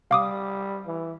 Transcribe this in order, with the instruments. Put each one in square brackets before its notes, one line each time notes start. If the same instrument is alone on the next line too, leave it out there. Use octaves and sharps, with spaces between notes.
[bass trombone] G3 [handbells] F5 D6 D#6
[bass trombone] E3